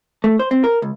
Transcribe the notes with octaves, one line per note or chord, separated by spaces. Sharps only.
A3
C5
C4
A#4
C#2